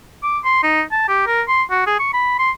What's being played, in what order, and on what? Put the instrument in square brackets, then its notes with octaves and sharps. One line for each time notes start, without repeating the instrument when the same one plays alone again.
[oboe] D6
C6
D#4
A5
G4
A#4
C6
F#4
G#4
C#6
B5
C6